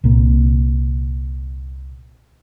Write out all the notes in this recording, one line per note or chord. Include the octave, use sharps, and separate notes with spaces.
C2 A#2